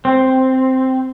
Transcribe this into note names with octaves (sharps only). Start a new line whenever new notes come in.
C4